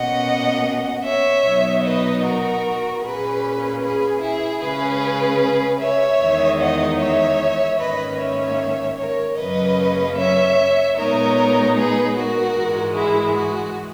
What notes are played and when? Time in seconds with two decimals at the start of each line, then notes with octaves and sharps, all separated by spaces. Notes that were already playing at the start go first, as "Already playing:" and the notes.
Already playing: B2 A#3 C#4 D#5 F#5
1.03 C#5 E5
1.44 B2 F#3 B3 D#4
1.83 B4 D#5
2.22 F#4 A#4
3.02 A#2 A#3 C#4 G#4 B4
3.81 G#4 B4
4.21 E4 G#4
4.61 C#3 G#3 C#4 G#4 B4
5.80 C#5 E5
6.20 E2 D#3 G#3 D#4
6.59 D#5 F#5
6.99 C#5 E5
7.78 G#2 D#3 A#3 C#4 B4 D#5
8.18 C#5 E5
8.97 A#4 C#5
9.38 F#2 C#3 F#3 A#3 C#4 B4 D#5
10.17 C#5 E5
10.96 A#2 G#3 B3 D#4 A#4 C#5
11.76 G#4 B4
12.16 F#4 A#4
12.55 G#2 E3 G#3
12.94 E4 G#4
13.35 F#4